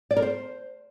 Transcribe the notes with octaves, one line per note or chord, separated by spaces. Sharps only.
D5
A#4
C5